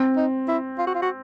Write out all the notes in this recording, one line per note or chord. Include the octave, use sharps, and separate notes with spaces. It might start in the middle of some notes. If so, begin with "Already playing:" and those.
Already playing: C4
D#4
E4
F4
F#4
F4
F#4